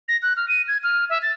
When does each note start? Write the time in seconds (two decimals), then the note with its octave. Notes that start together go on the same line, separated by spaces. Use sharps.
0.08 A#6
0.22 F#6
0.37 F6
0.48 D#7
0.68 G#6
0.83 F6
1.10 E5
1.22 A6